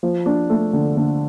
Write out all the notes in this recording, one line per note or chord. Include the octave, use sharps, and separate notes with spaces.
F3
D4
A3
D3
D3